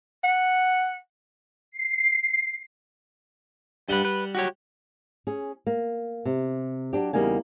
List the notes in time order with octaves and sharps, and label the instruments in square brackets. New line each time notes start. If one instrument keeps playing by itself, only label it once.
[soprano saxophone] F#5
[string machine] C7
[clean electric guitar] G2 B4 [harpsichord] G3 F#5
[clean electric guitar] B4
F#4 G4 C#5
[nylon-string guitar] C#4 G#4
A#3
C3
F#3 D4 G4
E2 C#3 G3 A#3 D#4 G#5